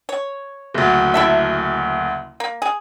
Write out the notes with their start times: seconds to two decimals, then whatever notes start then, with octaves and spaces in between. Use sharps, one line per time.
0.09 C#5
0.74 F#1 D2
1.14 E4 A4 E5
2.40 A#3
2.62 G#4